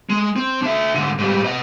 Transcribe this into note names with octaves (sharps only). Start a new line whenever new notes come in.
G#3
C4
D4 E5
G#2 D3
G#2 G3
B4 D#5